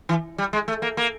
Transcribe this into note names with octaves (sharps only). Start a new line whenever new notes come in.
E3
G3
G#3
A3
A#3
A#3